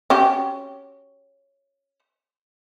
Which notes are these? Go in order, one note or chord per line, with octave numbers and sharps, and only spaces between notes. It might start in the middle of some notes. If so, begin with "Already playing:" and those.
C#4 F#4 G4